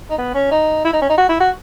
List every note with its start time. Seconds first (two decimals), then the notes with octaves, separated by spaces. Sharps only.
0.10 D#4
0.18 B3
0.35 C#4
0.51 D#4
0.85 E4
0.93 D#4
1.01 C#4
1.09 D#4
1.18 F#4
1.29 E4
1.40 F#4